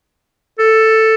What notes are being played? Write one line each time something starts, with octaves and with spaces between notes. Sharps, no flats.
A4